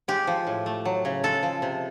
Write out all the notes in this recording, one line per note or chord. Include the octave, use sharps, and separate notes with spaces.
G#3 G4
F3
A2
A3
F#3
C#3
G#3 A4
F3
C3